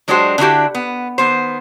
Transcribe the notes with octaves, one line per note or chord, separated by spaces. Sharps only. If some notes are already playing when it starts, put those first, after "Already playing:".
F#3 G#3 D4 F#4 G4 C5
D3 D4 E4 F#4 G4
B3
D#3 B3 C5